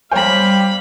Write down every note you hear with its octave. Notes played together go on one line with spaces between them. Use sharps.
G3 C5 C#5 F5 G5 B5